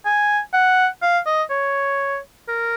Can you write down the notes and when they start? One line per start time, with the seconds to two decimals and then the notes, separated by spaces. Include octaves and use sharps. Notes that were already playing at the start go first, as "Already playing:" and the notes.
0.06 G#5
0.53 F#5
1.02 F5
1.26 D#5
1.50 C#5
2.48 A#4